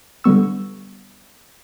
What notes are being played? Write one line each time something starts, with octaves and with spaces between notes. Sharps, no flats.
D3 G3 B3 C#6 E6